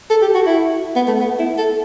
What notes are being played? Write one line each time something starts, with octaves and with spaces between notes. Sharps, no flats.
A4
G4
F#4
E4
B3
A3
B3
E4
A4